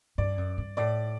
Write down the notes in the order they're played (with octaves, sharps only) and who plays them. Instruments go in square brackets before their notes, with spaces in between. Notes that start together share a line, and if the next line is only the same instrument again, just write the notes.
[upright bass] G2 [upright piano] D5
[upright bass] F#2
G2
[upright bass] A2 [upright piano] D5